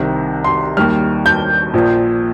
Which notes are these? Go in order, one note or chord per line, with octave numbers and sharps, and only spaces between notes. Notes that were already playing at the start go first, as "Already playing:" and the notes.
Already playing: C2 C3 D#3
C6
D#2 D#3 G3 F6
G6
A#1 A#2 F3